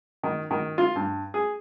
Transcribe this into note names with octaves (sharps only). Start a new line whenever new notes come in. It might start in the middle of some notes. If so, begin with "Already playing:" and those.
D#3
D#3
F4
G2
G#4